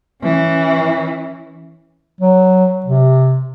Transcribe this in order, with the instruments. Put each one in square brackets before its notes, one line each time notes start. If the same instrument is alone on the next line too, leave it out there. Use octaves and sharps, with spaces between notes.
[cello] E3 C#4
[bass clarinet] F#3
C3